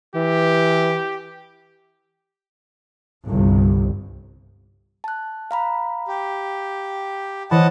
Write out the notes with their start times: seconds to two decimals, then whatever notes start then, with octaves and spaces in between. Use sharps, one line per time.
0.15 E3 G4
3.25 G1 C2
5.04 A5 F#6
5.51 F5 A#5 B5
6.08 G4
7.51 E3 C5 C#5 D#5 F#5 A5 B5